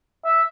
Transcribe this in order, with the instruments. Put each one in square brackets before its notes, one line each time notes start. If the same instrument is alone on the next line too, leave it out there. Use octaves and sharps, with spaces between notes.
[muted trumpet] E5